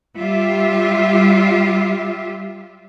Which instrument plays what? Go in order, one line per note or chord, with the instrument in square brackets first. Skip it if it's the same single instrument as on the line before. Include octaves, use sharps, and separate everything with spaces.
[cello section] G3 F4 G4 E5